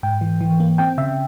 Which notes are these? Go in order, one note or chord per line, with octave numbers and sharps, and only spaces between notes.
G#2 G5
E3
E3
A#3
C4 G5
C#3 E5